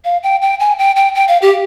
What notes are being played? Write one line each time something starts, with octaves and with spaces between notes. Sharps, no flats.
F5
G5
G5
G#5
G5
G5
G5
F5
G4